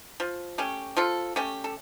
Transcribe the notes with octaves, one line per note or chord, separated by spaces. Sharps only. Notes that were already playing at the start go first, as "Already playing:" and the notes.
F3
A3 C#4 G4
F3 F4 A4
A3 C#4 G4
A4